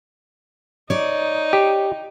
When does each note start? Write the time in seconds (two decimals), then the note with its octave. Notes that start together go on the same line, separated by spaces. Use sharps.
0.90 D#4 C#5 D5
1.53 G4